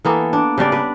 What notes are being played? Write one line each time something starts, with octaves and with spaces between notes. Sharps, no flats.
E3 A#3 B3 A4
D4
C#3 G3 D4 D5
D4 B4